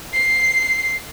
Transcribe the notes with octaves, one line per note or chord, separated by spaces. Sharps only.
C7